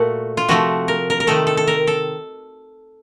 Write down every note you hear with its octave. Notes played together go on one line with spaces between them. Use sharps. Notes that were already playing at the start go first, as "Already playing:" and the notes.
Already playing: A#2 A3 F#4
F4
C3 F3 A3 F#4
A#4
A#4
A#4
C3 D#3 A3 A4
A4
A4
A#4
A4